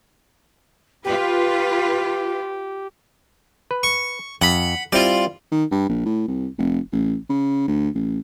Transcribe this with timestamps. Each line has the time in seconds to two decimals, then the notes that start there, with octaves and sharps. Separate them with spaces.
1.04 F4 G4 B4
3.71 B4
3.83 C#6
4.41 F2 F#5 B5
4.92 G3 C4 E4 F4 D5
5.52 D#3
5.71 G2
5.89 A#1
6.06 A2
6.28 C2
6.58 F1
6.92 A1
7.30 C#3
7.68 D2
7.95 A1